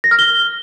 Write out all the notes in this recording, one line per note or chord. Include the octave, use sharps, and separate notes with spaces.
A#6
F6
G7